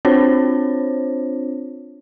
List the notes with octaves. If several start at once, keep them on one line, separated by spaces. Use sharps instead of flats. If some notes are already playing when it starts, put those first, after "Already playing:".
C4 D4 F4 C5 C#5